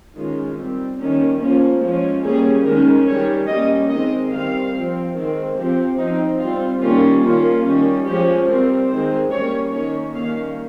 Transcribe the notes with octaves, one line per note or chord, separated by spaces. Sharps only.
D#3 G#3 C#4 F4
G3 C4
D#3 G3 A#3 C#4
F3 A#3 C#4
F3 G#3 C#4
G3 A#3 C#4 G#4
D#3 G#3 C#4 A#4
D#3 G3 C#4 C#5
G3 A#3 C#4 D#5
D#3 G#3 C4 D#5
D#3 G3 C4 F5
F3 C4
D#3 G#3 C4
F3 C4 G4
F3 C4 D#4
G3 C4 F4
D#3 G3 A#3 C#4 F4
D#3 A#3 C#4 F4
D#3 G3 C#4
F3 G#3 C#4 G4
G3 C4 A#4
D#3 G#3 C4 C5
G3 A#3 C#4 C#5
D#3 A#3 C#4 C#5
D#3 G3 A#3 C#4 F5